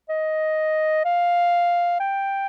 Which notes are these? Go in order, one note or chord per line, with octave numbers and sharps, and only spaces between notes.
D#5
F5
G5